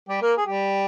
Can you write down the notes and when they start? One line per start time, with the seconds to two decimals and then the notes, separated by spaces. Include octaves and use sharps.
0.09 G3 G4
0.21 A#3 A#4
0.37 G#4
0.46 G3 G4